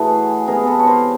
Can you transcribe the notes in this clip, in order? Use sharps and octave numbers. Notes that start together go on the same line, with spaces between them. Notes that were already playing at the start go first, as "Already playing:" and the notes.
Already playing: A2 E3 A3 F#4 G#4
C3 E3 G#3 B3 G#4 A#4
A4 B4
C#5
A#4 C5